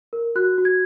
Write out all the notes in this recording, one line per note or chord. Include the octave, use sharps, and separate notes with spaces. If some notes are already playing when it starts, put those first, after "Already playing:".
A#4
F#4 F#6
F#4
G#6